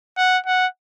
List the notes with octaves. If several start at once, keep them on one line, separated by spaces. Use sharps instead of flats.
F#5
F#5